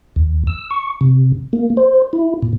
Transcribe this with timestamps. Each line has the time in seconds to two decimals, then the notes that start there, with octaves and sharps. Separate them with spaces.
0.16 D#2
0.47 E6
0.71 C#6
1.01 C3
1.53 A#3
1.77 C5
2.13 E4
2.42 A#2